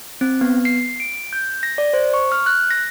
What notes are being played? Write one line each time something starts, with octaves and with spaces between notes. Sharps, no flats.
C4
B3
C7
D7
G6
A#6
D5
C5
C#6
F6
F#6
A#6